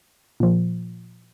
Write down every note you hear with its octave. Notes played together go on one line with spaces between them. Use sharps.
A#2 F3